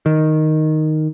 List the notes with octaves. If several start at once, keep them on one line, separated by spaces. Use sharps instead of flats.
D#3